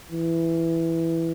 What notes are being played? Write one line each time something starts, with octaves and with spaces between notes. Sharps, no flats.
E3